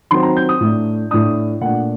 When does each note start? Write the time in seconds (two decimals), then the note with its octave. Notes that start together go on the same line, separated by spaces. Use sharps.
0.11 D#3 F#3 C4 C6
0.23 A#5
0.36 G6
0.49 D#6
0.60 A2 A3 D4
1.11 A2 A3 D4 D#6
1.61 A#2 A3 D4 F#5